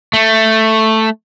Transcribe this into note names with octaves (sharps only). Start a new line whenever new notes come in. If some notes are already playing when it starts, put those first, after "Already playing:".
A3